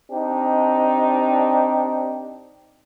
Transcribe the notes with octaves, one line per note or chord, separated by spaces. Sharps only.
C4 D4 D#4 G4